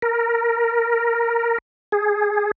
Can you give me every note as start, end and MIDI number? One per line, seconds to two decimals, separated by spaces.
0.02 1.58 70
1.92 2.51 68